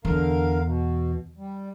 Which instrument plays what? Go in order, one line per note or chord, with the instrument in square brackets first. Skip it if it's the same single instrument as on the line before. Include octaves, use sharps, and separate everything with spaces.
[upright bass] E2 [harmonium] D3 A#4 F5
[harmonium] B2
G3